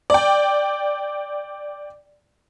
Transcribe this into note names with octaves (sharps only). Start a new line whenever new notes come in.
D5 G5